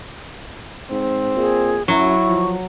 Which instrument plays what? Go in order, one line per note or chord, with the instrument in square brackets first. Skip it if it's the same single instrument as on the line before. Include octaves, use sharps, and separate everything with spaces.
[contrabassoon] G#2 [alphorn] C4
[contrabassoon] A#2 [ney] G#4
[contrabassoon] F#2 [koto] F#3 [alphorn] E4 [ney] C#6
[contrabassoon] F3